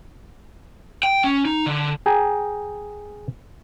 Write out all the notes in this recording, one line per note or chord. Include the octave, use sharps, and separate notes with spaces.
G5
C#4
D#4
D3
G#4 G5 G#5 A#5